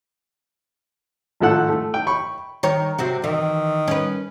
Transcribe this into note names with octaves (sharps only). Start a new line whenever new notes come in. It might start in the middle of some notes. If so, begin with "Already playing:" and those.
G#1 A2 F3 A4 F#5 F#6
A3
G5
B5 C#6
D#3 C#5
C3 C4 F#4
D#3 E3
C#4 B4